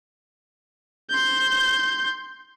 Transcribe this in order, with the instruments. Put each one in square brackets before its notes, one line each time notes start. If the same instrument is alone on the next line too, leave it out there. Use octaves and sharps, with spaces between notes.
[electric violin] C6 G6